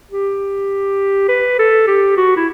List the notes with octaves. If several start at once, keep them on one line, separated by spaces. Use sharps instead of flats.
G4
B4
A4
G4
F#4
E4